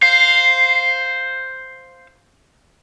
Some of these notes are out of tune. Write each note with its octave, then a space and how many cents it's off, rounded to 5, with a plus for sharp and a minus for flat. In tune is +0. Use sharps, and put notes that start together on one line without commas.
C5 +0 F5 +5